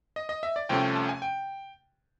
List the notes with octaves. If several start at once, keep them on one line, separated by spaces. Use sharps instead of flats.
D#5
D#5
E5
D5
C2 C3 F3 A3 C#4 G5
A5
G#5
G5